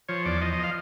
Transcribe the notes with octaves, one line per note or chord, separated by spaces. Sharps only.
F3 C#5
E2 D5
F3 D#5
D#5
F5